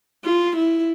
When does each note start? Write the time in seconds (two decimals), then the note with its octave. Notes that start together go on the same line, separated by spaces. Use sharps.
0.24 F4
0.57 E4